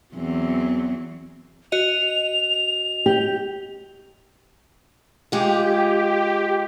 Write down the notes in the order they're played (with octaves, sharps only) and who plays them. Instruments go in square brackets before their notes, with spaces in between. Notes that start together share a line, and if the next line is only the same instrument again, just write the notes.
[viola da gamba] E2 F#3 C4
[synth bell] F#4 D#5 [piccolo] F7
[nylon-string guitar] G4
[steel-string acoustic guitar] G#3 F4 [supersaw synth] G4